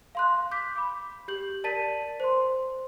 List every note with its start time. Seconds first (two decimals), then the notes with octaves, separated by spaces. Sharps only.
0.15 F5 C6 F#6
0.51 D6 G6 B6
0.76 B5 D6
1.28 G4 G6 F#7
1.64 A#4 D5 A5 A6 B6 D#7
2.20 C5 C6